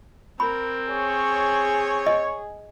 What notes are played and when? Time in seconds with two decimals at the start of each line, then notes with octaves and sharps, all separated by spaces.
0.40 C4 A#4 B5
0.89 G#4 C#5
2.07 D#5